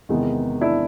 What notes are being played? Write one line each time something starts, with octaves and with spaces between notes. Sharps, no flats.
E2 C3 D#3 G#3 B3
D4 E4